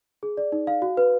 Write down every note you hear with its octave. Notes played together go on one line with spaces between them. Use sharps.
G#4
D5
D#4
F5
F#4
B4